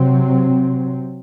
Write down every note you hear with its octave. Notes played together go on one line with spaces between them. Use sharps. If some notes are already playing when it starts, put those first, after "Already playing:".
Already playing: C3 F#3 C4